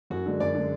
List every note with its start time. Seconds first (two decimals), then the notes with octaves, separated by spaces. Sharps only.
0.10 F#2 F#4
0.26 D3 G#3
0.40 F#2 D5
0.55 D3 G#3